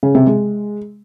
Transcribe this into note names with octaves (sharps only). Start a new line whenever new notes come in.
C#3
C3
G#3